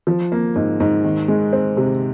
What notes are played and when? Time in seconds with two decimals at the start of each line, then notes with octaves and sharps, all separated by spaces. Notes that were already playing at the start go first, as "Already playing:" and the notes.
0.07 F3
0.32 A#3
0.56 G#2
0.80 G#2
1.04 D#3
1.28 G#3
1.53 C4
1.77 C3